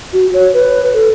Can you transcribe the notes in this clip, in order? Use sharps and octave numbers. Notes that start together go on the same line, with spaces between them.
F#4
C#5
B4
A4